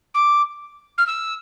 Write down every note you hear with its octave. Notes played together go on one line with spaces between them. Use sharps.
D6
F6
E6